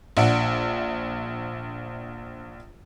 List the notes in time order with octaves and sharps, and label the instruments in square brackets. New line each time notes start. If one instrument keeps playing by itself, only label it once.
[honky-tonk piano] A#1 D4 E5 F#5 D7